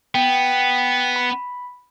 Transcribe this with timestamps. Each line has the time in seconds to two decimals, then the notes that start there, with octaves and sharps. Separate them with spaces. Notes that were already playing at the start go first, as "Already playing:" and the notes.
0.15 B3 G5
1.16 B5